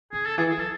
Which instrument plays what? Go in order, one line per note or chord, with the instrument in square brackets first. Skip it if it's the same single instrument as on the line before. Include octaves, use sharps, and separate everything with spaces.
[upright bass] C#3 [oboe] G#4
[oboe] A4
[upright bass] E3 [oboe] G#4
[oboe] G#4
[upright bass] F#3
[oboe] A4